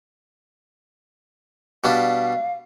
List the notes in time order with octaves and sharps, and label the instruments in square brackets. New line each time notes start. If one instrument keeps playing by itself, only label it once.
[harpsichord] B2 G3 D4 [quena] F5